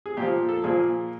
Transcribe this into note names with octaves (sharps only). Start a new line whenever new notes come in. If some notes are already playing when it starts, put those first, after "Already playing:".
G#4
A#2 F3 G4
A4
A#2 F3 G#4